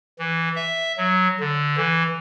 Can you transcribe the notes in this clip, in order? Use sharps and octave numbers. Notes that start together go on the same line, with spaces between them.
E3
E5
F#3
D3
E3